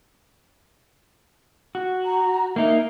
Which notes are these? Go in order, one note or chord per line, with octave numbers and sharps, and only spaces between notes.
F#4
A#5
A#3 D#4 E5